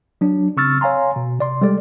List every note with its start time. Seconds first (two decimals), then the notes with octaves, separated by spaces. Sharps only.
0.21 F#3 D4
0.57 C#3 C4 C#6 E6 F6 A6
0.81 C#5 F5 G#5 A#5 C6
1.16 B2
1.39 C3 D5 C6
1.61 G3 G#3 A4 D5